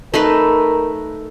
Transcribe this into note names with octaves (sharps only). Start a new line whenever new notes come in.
A3 D#4 A#4 B4